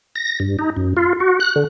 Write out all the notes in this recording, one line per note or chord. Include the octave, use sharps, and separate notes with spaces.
A#6
G2
D#4
F#2
F4
F#4
F#6
D3